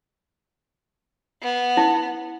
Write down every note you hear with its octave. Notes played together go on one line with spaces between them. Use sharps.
B3
E4